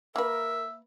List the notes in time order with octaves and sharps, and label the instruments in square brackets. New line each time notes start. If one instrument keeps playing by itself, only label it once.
[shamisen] A#3 B4 [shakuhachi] A#4 [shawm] E5